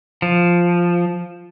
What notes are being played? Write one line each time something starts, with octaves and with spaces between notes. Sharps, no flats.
F3